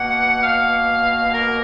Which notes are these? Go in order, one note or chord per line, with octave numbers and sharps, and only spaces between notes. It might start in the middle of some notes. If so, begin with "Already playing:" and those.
Already playing: B2 A#3 F#5
F5
A#4